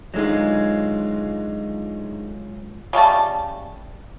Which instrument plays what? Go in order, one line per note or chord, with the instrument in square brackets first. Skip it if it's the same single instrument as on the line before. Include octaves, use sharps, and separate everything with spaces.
[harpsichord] D2 G#2 D#3 [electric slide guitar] F#3 G#3 F4
[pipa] C#3 G3 A3 A5